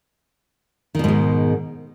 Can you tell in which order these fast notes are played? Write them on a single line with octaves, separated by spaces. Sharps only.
D#3 B2 G#2 G#3